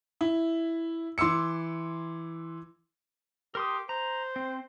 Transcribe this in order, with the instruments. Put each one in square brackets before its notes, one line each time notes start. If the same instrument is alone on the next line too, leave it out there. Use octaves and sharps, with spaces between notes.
[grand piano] E4
E3 C6 D6 E6 C#7
[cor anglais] G4 [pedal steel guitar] A#4 C6 D#6
[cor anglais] C5 [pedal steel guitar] A#5
[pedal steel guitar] C4